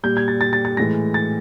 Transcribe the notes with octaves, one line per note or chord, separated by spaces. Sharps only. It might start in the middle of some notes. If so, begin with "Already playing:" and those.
A#2 G3 G6
G#6
A6
A6
A6
A6
A2 E3 G#3 A#6
A6